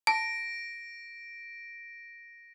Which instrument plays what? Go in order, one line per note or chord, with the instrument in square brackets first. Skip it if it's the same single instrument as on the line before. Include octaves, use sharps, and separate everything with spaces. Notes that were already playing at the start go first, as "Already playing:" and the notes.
[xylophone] A5 [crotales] A#6 D7